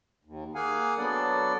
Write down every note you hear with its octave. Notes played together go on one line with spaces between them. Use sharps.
D#2
A#3 G#4 F5 F#5 G#5
F#3 B3 D4 A4 D5 F#5